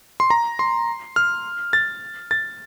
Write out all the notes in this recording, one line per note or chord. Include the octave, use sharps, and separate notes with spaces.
C6
A#5
C6
F6
A6
A6